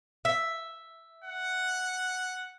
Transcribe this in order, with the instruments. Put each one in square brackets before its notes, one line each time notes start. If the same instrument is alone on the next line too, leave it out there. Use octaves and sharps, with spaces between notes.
[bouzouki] E5
[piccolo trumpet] F#5